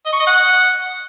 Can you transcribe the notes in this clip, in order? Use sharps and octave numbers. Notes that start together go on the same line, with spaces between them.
D#5
C#6
D#5
F#5